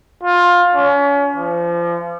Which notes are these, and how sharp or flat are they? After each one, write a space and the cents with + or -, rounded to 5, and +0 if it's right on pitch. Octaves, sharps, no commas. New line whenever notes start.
F4 +15
C#4 +35
F3 -30